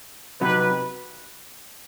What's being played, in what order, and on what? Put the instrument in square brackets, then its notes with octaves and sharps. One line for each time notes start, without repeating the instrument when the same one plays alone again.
[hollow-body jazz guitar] C3 F#3 B3 D#4 G4 [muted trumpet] B4